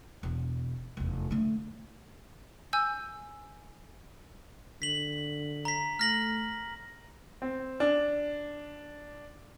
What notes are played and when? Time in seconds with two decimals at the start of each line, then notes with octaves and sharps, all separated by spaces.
0.23 E1
0.97 F1 E2
1.31 D3 A3
2.73 G#5 E6 G6
4.82 D3 B6 F#7
5.65 A#5 B6
5.99 A3 F6 A#6 F#7
7.42 C4
7.80 D4